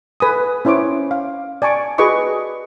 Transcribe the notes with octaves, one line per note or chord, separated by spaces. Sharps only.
A4 B4 G#5 D#6
C#4 E4 C5 C#5 D6
F5
D5 G#5 A5 C#6 D6
F#4 G#4 B4 D#5 C#6 D6